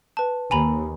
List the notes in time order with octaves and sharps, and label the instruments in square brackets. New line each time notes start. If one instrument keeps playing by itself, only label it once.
[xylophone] B4 A5
[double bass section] D#2 [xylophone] G#5 A#5 B5